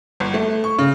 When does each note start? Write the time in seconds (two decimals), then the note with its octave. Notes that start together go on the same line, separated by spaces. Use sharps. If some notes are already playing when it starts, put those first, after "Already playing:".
0.20 G1
0.34 A3
0.64 C#6
0.79 C#3